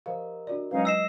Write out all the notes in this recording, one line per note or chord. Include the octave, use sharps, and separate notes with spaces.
F3 G4 A#4 C5 D#5 F5
D4 F#4 D5
F#3 G#3 C#4 D#4 B4 F5
D#5 E6 C7 E7